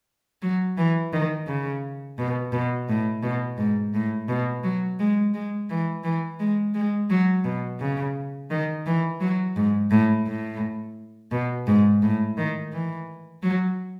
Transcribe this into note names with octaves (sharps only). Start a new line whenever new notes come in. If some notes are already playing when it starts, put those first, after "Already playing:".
F#3
E3
D#3
C#3
B2
B2
A2
B2
G#2
A2
B2
F#3
G#3
G#3
E3
E3
G#3
G#3
F#3
B2
C#3
D#3
E3
F#3
G#2
A2
A2
B2
G#2
A2
D#3
E3
F#3